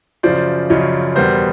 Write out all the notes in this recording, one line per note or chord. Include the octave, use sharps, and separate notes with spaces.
F#2 C#3 F3 C5 D5
F#2 C#3 F3 C#5 D#5
E2 B2 G3 B3 A#4 C5